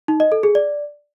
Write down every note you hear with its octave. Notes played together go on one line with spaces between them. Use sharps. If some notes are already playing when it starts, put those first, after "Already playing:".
D#4
D#5
A4
G#4
D5